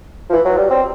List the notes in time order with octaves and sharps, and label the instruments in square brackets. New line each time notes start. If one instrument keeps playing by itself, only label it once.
[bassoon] F3
E3
F#3
G3
C4